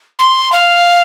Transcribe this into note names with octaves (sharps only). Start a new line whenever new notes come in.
C6
F5